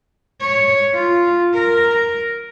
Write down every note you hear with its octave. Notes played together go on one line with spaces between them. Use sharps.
C#5
F4
A#4